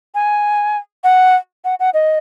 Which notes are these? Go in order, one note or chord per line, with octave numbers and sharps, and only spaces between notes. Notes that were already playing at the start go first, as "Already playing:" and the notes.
G#5
F#5
F#5
F#5
D#5